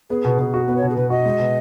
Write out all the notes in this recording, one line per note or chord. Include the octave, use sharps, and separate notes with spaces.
B3 G#4
B2
B2
F#4
B3 B4
C#5
B2
G#4
B2 B4
F#4 D#5
G#3
B2